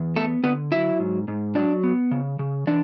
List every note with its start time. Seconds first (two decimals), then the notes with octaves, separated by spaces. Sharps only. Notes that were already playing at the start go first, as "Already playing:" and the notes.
Already playing: E2
0.16 A3 B3 A4
0.44 D3 B3 B4
0.72 F#3 E4 E5
1.00 G#2
1.28 G#2
1.55 F#3 D4 D5
1.84 B3
2.11 C#3
2.39 C#3
2.67 E3 D4 D5